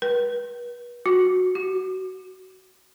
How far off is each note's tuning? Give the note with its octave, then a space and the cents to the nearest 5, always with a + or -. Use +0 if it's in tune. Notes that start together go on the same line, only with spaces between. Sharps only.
B4 -40
F#4 -15
F#4 +20